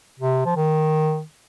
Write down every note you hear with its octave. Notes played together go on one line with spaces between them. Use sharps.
C3
F3
D#3